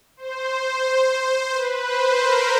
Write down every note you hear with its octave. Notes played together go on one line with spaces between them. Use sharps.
C5
C5
B4
C5
A#4